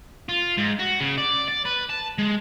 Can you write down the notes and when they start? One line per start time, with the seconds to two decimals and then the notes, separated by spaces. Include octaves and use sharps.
0.29 F4
0.57 G#2
0.79 F#4
1.00 C#3
1.17 D5
1.48 D5
1.65 B4
1.89 A5
2.18 G#3